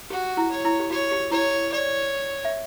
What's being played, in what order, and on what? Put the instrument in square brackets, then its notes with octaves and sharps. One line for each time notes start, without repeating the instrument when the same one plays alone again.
[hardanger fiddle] F#4 [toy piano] G4
[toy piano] E4
[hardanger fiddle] C#5
[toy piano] E4
G4
[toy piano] F#4 [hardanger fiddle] C#5
[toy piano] G4
[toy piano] E4 [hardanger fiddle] C#5
[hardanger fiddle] C#5 [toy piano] D5
[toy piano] E5